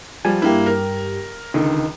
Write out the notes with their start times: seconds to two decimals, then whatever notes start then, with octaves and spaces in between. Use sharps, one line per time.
0.25 F3 G3 G#5
0.42 G2 A#3 E4 G4
0.66 A#4
1.54 C#2 D3 D#3